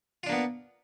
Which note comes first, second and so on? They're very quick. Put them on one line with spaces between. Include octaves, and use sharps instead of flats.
F4 D4 A#3 B3